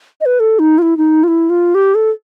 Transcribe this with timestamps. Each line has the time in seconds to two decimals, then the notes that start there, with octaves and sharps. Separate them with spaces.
0.21 D#5
0.26 B4
0.40 A4
0.59 D#4
0.78 F4
0.82 E4
0.97 D#4
1.23 F4
1.28 E4
1.50 F4
1.75 G4
1.95 A4